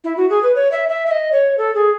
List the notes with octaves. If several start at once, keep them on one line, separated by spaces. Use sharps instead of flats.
E4
F#4
G#4
B4
C#5
E5
E5
E5
D#5
C#5
A4
G#4